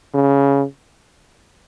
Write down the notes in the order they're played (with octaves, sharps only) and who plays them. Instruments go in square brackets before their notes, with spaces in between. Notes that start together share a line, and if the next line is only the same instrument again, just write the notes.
[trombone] C#3